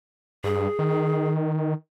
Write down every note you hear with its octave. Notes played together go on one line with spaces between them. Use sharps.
G2 G#4
D#3